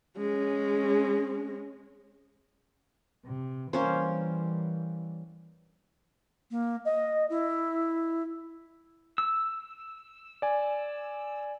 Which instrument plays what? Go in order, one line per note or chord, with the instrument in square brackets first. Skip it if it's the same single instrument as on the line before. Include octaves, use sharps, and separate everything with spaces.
[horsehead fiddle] G#3 C#4
[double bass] C3
[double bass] E3 G3 [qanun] A#3 C#4 C5
[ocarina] A#3
D#5
E4
[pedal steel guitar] E6
[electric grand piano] D5 G#5